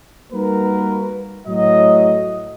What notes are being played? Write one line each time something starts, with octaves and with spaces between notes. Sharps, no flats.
G3 A#3 D#4 F#4 A#4 B4
A2 F#3 D#5